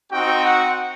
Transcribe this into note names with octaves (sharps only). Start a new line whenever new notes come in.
C4 D#4 F#4 G5
F#5